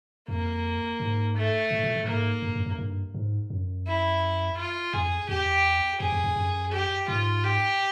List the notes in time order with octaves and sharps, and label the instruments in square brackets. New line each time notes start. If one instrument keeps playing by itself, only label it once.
[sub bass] F2 [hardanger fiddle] A#3
[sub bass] G#2
[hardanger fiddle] A3
[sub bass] A2
A#2
A2
[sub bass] G#2 [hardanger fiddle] A#3
[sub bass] G2
F#2
F#2
G2
G#2
F#2
[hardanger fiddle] E4
F4
[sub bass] F2 [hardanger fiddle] G#4
[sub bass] E2 [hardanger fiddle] G4
[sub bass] F2 [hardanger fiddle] G#4
[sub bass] F2
F2
F#2
[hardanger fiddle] G4
[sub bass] G#2 [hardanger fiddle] F4
[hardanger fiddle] G4